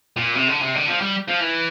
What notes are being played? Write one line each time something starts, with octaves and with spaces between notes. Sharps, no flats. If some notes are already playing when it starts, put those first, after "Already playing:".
A#2
C3
D3
C3
D3
F3
G3
F3
E3